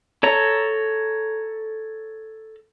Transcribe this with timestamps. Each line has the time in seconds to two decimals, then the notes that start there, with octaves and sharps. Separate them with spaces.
0.23 A4 C#5 A#5